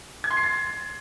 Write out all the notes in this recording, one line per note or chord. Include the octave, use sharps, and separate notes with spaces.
G#6
C6
C7
A6